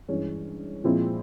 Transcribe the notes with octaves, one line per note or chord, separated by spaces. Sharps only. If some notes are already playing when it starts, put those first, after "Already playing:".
G2 E3 G#3 C#4
A#2 F3 G#3 C4 E4